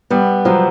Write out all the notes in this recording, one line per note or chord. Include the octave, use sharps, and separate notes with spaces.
G3 B3
F3 F#3